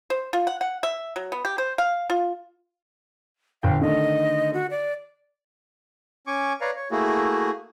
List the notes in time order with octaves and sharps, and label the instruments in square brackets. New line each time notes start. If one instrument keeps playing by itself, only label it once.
[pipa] C5
F4
F#5
F#5
E5
F#3
B3
G4
C5
F5
F4
[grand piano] G1 G5 [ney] F5
[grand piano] D3 D#3 A3 [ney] D#5
[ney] F#4
D5
[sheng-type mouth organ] C#4 G#5 C#6 D6
B4 C#5 D5 F5 A#5
C#5
A3 A#3 E4 F#4 G#4